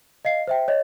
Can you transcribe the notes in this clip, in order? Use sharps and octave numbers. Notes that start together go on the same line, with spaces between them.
D#5 F5 C7
C5 E5 G5
C#5 D#5